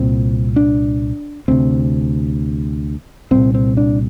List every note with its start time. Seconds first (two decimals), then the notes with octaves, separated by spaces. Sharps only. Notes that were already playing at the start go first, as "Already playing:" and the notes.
Already playing: C2 A#2 C4
0.56 D4
1.48 D2 C3 C4
3.31 C2 A#2 C4
3.54 C4
3.77 D4